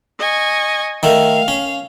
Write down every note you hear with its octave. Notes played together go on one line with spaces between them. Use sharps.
D#5 G#5 C#6
D#3 A3 F5
C#4